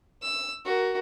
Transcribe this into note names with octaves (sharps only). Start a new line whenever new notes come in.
E6
F#4 A#4